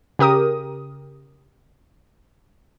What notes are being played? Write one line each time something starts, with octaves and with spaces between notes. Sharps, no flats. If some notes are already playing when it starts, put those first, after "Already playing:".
C#3 G4 A#4 D#6